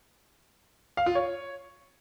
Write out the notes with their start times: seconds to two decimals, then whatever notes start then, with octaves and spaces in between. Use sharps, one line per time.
0.97 F5
1.06 F4
1.15 C#5